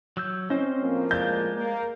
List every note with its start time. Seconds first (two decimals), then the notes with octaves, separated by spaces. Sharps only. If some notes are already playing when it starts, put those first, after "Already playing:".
0.17 F#3 E6 G6
0.50 C4 C#4 C5 D#5
0.82 A2 F3 A#3
1.11 G#3 D5 G6
1.56 A#3